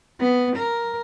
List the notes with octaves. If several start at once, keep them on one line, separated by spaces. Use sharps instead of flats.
B3
A#4